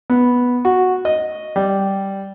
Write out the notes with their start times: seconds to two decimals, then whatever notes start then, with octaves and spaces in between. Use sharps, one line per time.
0.10 B3
0.65 F#4
1.05 D#5
1.56 G3